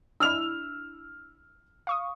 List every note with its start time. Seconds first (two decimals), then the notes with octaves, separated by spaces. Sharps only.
0.20 D4 E4 E6 F6 F7
1.87 F5 C#6 D#6